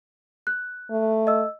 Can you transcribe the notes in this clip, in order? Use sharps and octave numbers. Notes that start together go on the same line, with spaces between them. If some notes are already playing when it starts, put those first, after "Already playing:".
F#6
A3
D#5 E6